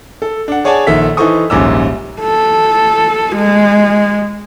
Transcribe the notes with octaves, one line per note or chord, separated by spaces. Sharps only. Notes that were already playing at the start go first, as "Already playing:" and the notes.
A4
D4 F#5
G#4 C#5 D5 F#5 G#5 A5
A#1 D#3 A4 E5 B6
E3 D#4 A4 C5 C#6 D#6
D#1 A#1 G#2 C#4 D6 E6
A4
G#3